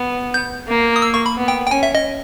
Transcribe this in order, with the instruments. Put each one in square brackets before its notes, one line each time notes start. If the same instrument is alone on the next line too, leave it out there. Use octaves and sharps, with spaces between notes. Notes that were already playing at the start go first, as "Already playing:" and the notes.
Already playing: [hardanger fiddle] B3
[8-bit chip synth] G6
[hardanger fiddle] A#3
[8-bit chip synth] D#6
E6
C#6
B5
[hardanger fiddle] B3
[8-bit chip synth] G5
G5
[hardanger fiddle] C#4 [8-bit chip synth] G#5
[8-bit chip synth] E5
D#5